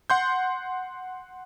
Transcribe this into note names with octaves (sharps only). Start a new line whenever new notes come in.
F#5 C6 G6